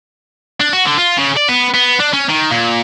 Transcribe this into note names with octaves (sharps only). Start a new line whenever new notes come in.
D4
F#4
D3
F4
C#3
D5
B3
B3
D4
C#4
D#3
A#2